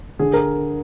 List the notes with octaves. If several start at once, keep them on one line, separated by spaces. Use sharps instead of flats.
D3 G#4
A#4